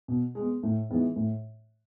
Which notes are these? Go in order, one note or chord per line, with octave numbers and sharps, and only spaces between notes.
B2
G#3
B3
A2
E3 G#3 B3 D#4
A2